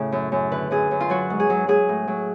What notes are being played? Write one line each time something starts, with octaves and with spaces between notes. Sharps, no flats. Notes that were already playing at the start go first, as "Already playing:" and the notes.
Already playing: A2 C#3 C#5
F#2
F#2
D3 B4
F#2 G#4
F#2
F4
F#3 F#4
G#2
G#4
F#3
F#3 G#4
A2
F#3